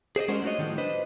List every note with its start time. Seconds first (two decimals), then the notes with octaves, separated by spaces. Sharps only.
0.16 G#4 C5 D5 D#5
0.28 G#3 C#4 D4 F#4 A#4 C5
0.43 A3 D4 F#4 C#5 D#5
0.59 A2 D#3 F3 G3 A3
0.78 D4 B4 C5 D#5